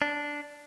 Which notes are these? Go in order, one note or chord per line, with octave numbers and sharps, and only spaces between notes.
D4